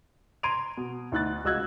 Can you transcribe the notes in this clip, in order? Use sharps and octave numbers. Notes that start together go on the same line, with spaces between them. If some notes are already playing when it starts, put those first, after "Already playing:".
A#5 C6 G#6 D7 D#7 F7
B2
D2 D#4 F#6 A6
C#2 F#4 D#5 E6 F#6 G#6